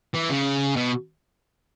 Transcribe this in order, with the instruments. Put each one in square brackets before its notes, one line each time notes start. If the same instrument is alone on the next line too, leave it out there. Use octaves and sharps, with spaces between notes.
[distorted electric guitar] E3
C#3
B2